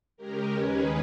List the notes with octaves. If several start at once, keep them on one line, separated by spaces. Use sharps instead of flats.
C#3 G#3 C#4 G4 A#4
D#2 D#3 G#3 C#4 G#4 B4